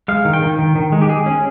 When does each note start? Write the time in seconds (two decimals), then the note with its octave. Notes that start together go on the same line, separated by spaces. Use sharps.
0.08 G#3 F5
0.25 D#3
0.33 G5
0.42 D#3
0.59 D#3
0.76 D#3
0.92 G#3
1.02 G4
1.09 G#3 G#4
1.26 C#4